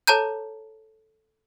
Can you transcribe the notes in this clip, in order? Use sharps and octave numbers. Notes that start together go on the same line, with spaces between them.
A4 C#5 A5 A#5 G6